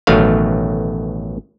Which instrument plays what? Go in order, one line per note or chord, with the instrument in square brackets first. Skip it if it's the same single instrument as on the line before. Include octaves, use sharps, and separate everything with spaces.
[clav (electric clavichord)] A1 B2 D#3 F#3 A3 F5